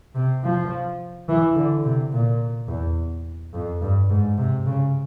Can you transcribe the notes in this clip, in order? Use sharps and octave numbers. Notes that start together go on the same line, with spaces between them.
C3
F3
E3
D3
C3
A#2
E2
F2
G2
G#2
C3
C#3